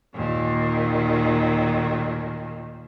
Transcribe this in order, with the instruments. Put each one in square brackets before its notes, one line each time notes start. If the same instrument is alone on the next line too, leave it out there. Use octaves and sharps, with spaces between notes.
[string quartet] D#2 A#2 D#3